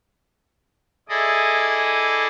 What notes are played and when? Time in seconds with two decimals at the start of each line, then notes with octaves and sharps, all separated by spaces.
1.09 E4 G#4 A4 D5 D#5